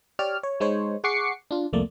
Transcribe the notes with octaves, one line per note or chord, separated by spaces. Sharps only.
G4 C#5 D5 F6
C#5
G#3 D#4 C5 C#5
G#4 F#5 C#6 D6 C7 C#7
D4 F4
C2 F2 A3 A#3 D5